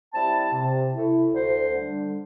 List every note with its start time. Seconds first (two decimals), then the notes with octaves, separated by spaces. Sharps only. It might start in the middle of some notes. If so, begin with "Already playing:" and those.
0.13 G3 C4 E4 A5
0.53 C3
0.94 A3 E4
1.33 D2 C5
1.73 D3 G3 D4